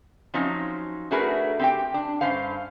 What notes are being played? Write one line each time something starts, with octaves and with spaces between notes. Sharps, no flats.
F3 F#3 C4 C#4 D#4
A3 D4 F#4 G#4 A#4 B4
C4 G4 G5
D4
G2 C#4 C5 F5